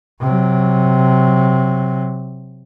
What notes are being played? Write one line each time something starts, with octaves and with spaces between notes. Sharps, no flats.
C3 F#3